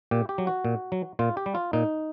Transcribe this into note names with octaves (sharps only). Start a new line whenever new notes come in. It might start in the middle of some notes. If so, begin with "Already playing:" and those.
A#2 G4
G4
F#3
F#4
A#2
F#3
A#2 F4
G4
G3
F4
A#2 D#4